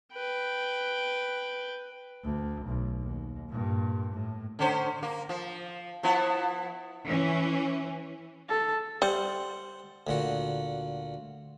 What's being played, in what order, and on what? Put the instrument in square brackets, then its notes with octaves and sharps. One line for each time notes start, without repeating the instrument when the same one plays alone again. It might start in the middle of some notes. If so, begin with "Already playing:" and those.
[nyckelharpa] B4 G5
[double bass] D2
B1
D#2
G2 A#2
A2
[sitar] D3 C#4 C5
A#3
F3
F3 B3 E4
[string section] E3 C#4
[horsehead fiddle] A4
[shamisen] G3 [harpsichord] C5 F#5
[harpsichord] D2 A#2 F#4